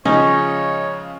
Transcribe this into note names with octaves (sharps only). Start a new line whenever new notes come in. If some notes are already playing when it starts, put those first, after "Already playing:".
C#3 F3 G#3 C#4 D#4 C#5